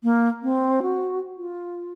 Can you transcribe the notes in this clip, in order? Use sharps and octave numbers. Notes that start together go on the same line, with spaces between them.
A#3
C4
F#4
F4